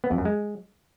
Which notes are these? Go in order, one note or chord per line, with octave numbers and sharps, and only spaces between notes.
B3
F2
F#2
G#3